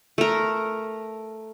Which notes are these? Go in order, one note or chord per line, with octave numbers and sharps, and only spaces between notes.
A3 A#4